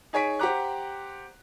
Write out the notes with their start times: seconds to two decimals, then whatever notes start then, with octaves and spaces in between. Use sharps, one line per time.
0.13 D#4 G#4 C#5 G#5 B6 D7
0.39 G4 C5 F#5 A#5 D6 F#6